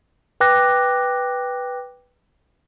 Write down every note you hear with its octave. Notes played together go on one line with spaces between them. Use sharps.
B4 G5 D6 F#6 A#6